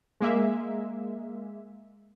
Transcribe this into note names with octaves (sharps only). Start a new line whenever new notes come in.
G#3 A#3 E5